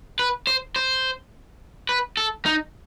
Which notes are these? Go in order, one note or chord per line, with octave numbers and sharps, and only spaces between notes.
B4
C5
C5
B4
A4
D#4